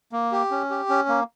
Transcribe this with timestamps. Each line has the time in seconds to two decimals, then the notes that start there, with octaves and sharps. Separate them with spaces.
0.12 A#3
0.32 G4
0.51 C#4
0.70 G4
0.89 C#4
1.09 A#3